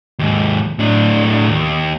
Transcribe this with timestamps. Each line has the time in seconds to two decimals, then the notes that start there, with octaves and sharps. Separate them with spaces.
0.19 D#2 G#2
0.79 A2 D4
1.48 D#2